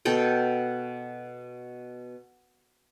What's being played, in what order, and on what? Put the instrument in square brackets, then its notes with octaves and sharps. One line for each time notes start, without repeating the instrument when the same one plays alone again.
[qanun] B2 A4 G5